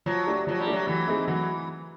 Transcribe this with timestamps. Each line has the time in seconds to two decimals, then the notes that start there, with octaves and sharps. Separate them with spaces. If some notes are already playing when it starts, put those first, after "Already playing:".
0.06 F3 F#3
0.27 A3 D4 G4
0.47 F3 F#3
0.60 G3
0.67 A3 D4 G4
0.73 F#3
0.87 E3 F#3
1.08 A3 C4 D#4 G#4
1.28 E3 F#3